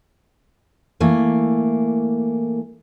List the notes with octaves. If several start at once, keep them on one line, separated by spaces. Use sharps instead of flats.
E3 A3 A#3